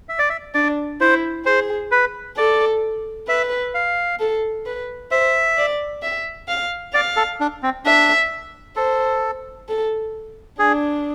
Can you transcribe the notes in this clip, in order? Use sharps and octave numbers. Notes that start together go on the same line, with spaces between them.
E5
D5
E5
D4 D5
E4 C5
G#4 C5
B4
A4 D5
B4 E5
F5
A4
B4
C5 E5
D5
E5
F5
D5 F5
A4
D4
C4
D4 E5
A4 C5
A4
D4 G#4